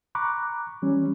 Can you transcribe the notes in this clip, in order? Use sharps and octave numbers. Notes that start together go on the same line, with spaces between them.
A#5 B5 C#6 D6 F#6
E3 G3 C#4